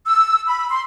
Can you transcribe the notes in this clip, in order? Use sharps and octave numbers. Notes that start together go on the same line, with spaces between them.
E6
B5
C6